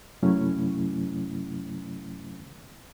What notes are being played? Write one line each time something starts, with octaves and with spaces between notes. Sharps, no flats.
F#2 C3 F#3 A3 C#4 E4